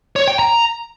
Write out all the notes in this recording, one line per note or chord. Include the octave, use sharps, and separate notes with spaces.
C#5
G5
A#5